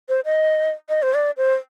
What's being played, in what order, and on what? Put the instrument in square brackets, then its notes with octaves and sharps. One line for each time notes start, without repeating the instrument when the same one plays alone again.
[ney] C5
D#5
D#5
C5
D5
C5